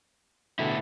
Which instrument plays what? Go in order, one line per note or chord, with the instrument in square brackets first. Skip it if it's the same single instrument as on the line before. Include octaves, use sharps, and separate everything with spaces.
[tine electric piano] B2 D3 [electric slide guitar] A3 B3 E4